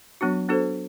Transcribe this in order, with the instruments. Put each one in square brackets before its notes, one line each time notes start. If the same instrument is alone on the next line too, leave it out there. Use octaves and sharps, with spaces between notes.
[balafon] F#3 B3 D4 F#4
B3 D4 F#4 A4 C5